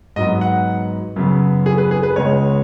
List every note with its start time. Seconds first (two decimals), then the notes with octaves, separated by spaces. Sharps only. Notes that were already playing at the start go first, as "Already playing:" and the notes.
0.16 G#2 F#3 B3 D#5
0.41 F#5
1.16 F#2 C#3 B3
1.66 G#4
1.78 B4
1.91 G#4
2.03 B4
2.16 C#2 C#3 G#3 B3 C#5